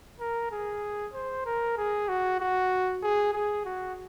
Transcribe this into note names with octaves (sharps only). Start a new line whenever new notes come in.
A#4
G#4
C5
A#4
G#4
F#4
F#4
G#4
G#4
F#4